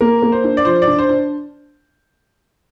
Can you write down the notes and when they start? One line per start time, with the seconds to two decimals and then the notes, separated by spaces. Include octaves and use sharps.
0.01 A#3 A#4
0.22 A#3
0.32 C5
0.44 D4
0.57 D5
0.65 F3 C5
0.82 D5
0.87 D4
0.99 C5
1.09 D4